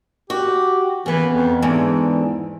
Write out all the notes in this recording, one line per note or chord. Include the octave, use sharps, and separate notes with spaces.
F#4 G4
C#3 E3 B3
F2
E2 G#2 D3 E3